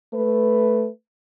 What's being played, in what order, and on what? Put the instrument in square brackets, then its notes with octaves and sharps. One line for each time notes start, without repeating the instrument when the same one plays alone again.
[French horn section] A3 B4